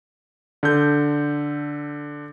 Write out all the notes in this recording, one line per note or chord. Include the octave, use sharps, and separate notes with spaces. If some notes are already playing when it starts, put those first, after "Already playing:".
D3 A4 G6